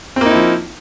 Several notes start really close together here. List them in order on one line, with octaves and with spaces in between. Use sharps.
C4 A#3 D#4 E4 F3